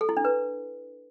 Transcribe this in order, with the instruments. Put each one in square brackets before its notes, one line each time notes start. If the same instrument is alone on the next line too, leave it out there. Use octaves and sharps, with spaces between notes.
[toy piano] A4
E4
D4
B4